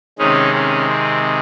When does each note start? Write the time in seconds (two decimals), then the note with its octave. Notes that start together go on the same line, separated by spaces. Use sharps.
0.19 C3 D#3 G#3 C#4 D#4
0.54 C#4
0.89 C4